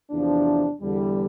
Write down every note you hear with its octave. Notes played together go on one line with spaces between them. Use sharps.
E2 C3 F3 D4
E2 D3 G3